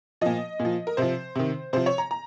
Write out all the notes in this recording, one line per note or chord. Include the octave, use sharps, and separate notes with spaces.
A#2 F3 D#5
A#2
F3
A#4
C3 F3 C5
C3 D#3
C3 F3 C5
C#5
A#5
A#5